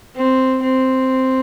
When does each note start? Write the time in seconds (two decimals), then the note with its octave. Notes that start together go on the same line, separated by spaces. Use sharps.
0.16 C4
0.63 C4